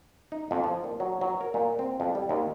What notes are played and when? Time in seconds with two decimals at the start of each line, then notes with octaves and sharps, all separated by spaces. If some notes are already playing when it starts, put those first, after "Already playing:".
0.32 D#4
0.51 F2
0.64 F3
0.84 A#2
1.00 F#3
1.21 F#3
1.41 A#4
1.54 A#2
1.79 C4
2.00 F2
2.15 G3
2.29 D#2